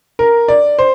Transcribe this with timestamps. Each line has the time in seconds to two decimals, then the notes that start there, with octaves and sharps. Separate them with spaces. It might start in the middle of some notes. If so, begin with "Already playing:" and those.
0.19 A#4
0.48 D5
0.79 C5